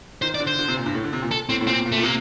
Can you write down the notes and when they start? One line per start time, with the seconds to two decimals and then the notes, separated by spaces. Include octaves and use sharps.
0.22 D#3 C5
0.35 D5
0.40 D3
0.47 C5
0.59 D3
0.68 C3
0.77 A#2
0.86 G2
0.95 A2
1.04 D3
1.13 C3
1.22 A#2
1.31 A4
1.49 A2 C4
1.61 A2
1.67 A#2 C4
1.86 A#2
1.92 A3
1.97 A#2
2.03 C3 A#3